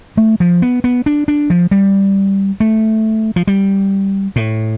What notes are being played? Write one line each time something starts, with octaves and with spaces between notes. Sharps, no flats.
A3
F3
B3
B3
D4
D4
F3
G3
A3
F3
G3
A2